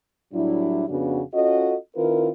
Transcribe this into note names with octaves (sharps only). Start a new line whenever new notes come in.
A2 F#3 G3 D4 E4
F2 C#3 B3 D4 F#4
C#4 F4 F#4 A4 D#5
D#3 C4 E4 F4 A#4 B4